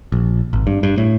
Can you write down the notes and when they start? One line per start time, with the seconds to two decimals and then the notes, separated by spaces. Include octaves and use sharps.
0.12 A#1
0.53 G#1
0.67 G2
0.83 G2
0.98 A2